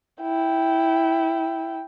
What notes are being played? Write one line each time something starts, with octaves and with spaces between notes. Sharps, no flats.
E4 G5